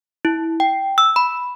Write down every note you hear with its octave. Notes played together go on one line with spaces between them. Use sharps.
E4
G5
E6
B5